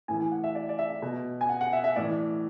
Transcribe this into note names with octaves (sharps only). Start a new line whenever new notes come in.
A2 E3 G#5
G#5
F#5
E5
D5
D5
E5
B2
G#5
F#5
F#5
E5
E5
A2 E3 D5